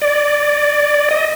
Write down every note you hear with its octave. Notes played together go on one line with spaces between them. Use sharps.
D5
D#5